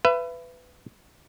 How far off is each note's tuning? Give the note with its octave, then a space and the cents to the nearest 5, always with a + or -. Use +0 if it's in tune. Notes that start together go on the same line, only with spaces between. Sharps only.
B4 +15 E5 +35